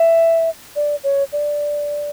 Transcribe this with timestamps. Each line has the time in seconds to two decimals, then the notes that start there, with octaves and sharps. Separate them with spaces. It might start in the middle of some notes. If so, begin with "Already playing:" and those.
Already playing: E5
0.76 D5
1.04 C#5
1.32 D5